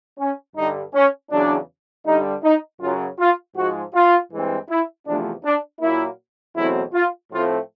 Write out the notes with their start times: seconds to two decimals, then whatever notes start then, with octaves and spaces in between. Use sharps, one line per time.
0.19 C#4
0.56 G2 D3 G3 D#4
0.94 C#4
1.31 E2 C#3 F#3 D4
2.06 G2 D3 G3 D#4
2.43 D#4
2.81 F#2 C#3 F#3 F4
3.19 F4
3.56 G#2 F3 G#3 F#4
3.94 F4
4.31 G2 E3 G#3 C4
4.69 E4
5.06 E2 C3 F3 A3 D4
5.44 D4
5.81 A#2 F#3 A#3 E4
6.56 E2 B2 F#3 A3 C4 E4
6.94 F4
7.31 A2 F3 A3 C4 F4